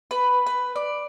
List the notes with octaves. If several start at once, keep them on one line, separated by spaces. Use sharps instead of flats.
B4
B4
D5